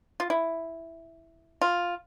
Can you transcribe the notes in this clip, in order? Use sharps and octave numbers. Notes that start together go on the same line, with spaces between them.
F4
E4
F4